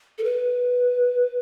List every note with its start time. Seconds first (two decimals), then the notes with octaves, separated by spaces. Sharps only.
0.18 A4
0.24 B4